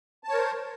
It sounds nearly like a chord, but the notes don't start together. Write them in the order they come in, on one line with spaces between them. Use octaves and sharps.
A5 C#5 A#4 C5